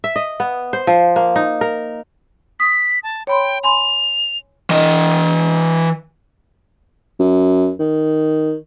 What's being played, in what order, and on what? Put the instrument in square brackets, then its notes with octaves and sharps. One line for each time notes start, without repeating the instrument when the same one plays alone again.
[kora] E5
D#5
B3
C5
F3
A#3
D#4
A#4
[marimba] D#6 [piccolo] B6
[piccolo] A5
[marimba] C#5 B5 C6 [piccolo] G5
[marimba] G#5 B5 C6 [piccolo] F7
[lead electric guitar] E3 D#5
[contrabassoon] F#2
D#3